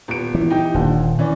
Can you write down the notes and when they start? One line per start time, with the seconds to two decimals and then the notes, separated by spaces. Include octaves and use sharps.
0.08 D#1 B3 D7
0.35 E3
0.50 D#4 G4 G5
0.74 D#1 A#2 D3
1.19 E3 C#4 D5